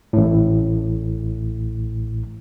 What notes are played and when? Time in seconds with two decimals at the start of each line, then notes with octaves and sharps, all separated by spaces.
0.13 A1 A2